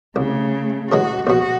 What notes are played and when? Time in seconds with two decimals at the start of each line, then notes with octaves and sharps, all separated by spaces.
0.16 C2 C#3 A3
0.92 C#3 E3 G#3 F#4
1.27 A#1 B2 F#4